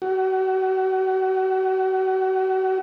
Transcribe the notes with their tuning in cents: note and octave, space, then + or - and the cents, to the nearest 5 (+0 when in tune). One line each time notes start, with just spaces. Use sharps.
F#4 +35